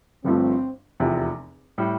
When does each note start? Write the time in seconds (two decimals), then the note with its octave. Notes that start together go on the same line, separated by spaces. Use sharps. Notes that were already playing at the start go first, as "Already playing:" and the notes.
0.24 G1 G2 F3 A3 C4
1.00 F1 E2 C3 F3
1.78 A2 G3